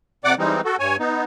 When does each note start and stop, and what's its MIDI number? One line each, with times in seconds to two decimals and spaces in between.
0.24 0.35 41
0.24 0.35 48
0.24 0.35 74
0.24 0.35 78
0.24 0.35 86
0.38 0.61 52
0.38 0.61 55
0.38 0.61 56
0.38 0.61 60
0.38 0.61 63
0.65 0.76 66
0.65 0.76 69
0.79 0.96 43
0.79 0.96 73
0.79 0.96 80
0.99 1.24 59
0.99 1.24 63